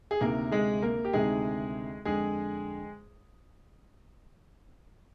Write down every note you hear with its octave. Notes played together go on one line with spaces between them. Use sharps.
G#4
D2 C3 D#3 A#3 A#4
G#3 G#4
A#3 A#4
G4
D2 C3 D#3 G#3 G#4
F2 D3 G#3 G#4